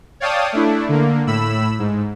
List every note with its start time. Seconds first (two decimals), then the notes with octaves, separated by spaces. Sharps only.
0.20 C#5 D5 F5 G5 A5 D#6
0.53 A3 D4 E4
0.89 D3 A#3
1.27 A2 B5 E6
1.79 G#2